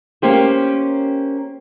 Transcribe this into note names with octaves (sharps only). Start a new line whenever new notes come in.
A#3 C#4 G4 C5